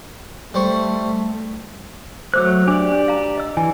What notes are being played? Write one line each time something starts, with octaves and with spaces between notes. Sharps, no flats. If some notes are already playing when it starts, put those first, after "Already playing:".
G3 A3 C5 C#6
F#3 A3 C5 D6 E6 F#6
D4 G4 D5 D6
D4
F5 A#5
D#5 E6
E3 G#5